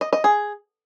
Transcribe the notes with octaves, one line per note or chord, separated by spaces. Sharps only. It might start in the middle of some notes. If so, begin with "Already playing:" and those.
D#5
D#5
G#4